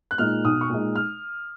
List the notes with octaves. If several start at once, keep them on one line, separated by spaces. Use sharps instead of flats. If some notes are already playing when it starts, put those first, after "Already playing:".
F#6
A#2 G#3 D#4 F6
B1 D#6
C#6
A#2 G#3 D#4
F6